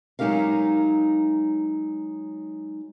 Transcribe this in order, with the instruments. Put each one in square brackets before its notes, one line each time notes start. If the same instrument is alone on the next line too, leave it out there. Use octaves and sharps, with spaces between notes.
[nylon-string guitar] F#3 G#3 D#4 G4 A#4 F5